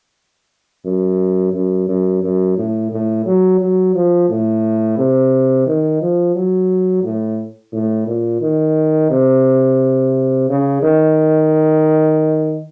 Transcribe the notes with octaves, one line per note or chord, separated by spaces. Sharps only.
F#2
F#2
F#2
F#2
A2
A2
F#3
F#3
F3
A2
C3
D#3
F3
F#3
A2
A2
A#2
D#3
C3
C#3
D#3